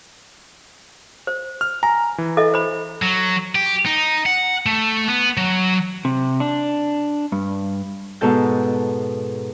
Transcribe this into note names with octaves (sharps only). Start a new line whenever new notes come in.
C5
F6
G#5 A#5
E3
A4 D#5 E5
C5 B5
F#3
G4
D#4
F#5
A3
B3
F#3
C3
D4
G2
G#2 B2 A4 A5 G6